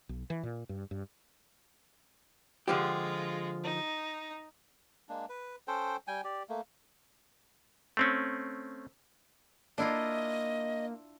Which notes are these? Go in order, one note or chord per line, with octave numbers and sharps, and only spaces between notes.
B1
E3
A#2
G2
G2
D3 F3 G#3 F4 G4
D#4
G#3 A#3 D4
B4
C#4 A4 C5 G5
G3 G5 G#5
G4 D5
A3 A#3
A3 C4 C#4
A#3 D4 E4 F4 D#5